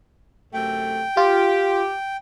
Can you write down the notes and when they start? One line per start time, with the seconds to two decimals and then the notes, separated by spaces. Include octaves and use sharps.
0.54 F#2 C3 A3 G5
1.17 F4 G4